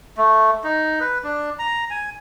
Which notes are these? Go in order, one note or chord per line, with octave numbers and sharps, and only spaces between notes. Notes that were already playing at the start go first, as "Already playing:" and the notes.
A3
D#4
B4
D4
A#5
G#5